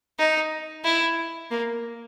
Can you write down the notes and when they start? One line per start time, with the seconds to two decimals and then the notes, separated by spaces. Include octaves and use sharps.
0.19 D#4
0.84 E4
1.51 A#3